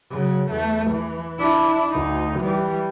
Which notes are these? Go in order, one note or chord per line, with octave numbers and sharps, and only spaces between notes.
C#3 F#3
E2 A3
E3
D4 E4
D2 D#4
E3 G3